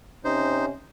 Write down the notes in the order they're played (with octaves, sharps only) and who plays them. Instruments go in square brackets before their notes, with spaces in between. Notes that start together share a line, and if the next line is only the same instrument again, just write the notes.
[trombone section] C3 C#4 [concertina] D#4 C5